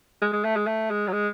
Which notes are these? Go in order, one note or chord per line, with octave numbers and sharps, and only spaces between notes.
G#3
G#3
A3
G#3
A3
G#3
F#3
G#3